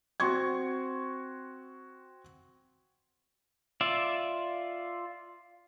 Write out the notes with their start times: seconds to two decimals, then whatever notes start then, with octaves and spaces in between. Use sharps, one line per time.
0.20 C4 F#4 C6 C#6 G#6
3.81 F4 D5 E5